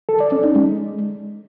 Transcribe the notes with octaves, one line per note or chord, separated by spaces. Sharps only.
A4
D5
C#4
D#4
G#3